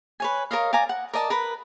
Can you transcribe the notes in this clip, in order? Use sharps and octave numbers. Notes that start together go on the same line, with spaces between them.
B4 C#5 G#5
A#4 C#5 D#5 F5
D5 F5 G#5 A#5
F#5
A#4 D5 D#5 A5
A#4 B4 B5